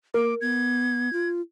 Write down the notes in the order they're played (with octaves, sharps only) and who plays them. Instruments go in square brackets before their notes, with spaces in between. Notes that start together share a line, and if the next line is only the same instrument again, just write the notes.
[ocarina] A#3 [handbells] A#4 [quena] D6
[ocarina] B3 [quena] G#6
[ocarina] F4